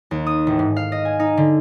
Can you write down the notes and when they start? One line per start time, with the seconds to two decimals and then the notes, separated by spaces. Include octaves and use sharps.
0.11 D#2
0.26 D#6
0.47 A1
0.59 G#2
0.77 F5
0.92 D#5
1.05 G#5
1.19 D#4
1.37 D3